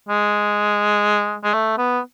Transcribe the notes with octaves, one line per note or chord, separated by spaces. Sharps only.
G#3
G#3
A3
B3